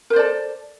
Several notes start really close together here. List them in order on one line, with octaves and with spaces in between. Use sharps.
A#4 C5 D5 A4